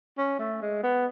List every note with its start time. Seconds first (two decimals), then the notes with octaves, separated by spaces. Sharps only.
0.18 C#4
0.39 A3
0.62 G#3
0.83 B3